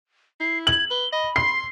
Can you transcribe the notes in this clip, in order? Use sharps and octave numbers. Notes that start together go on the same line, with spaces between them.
E4 C7
G#6 F#7
B4 G7
D#5 B5
C6 C7